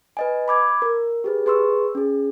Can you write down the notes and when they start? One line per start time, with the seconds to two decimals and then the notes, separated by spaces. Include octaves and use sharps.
0.17 B4 D#5 G#5
0.48 B5 D6 G#6
0.82 A#4
1.24 G4 G#4 B4
1.46 G#4 B4 C6 C#6 E6
1.95 C#4 G#4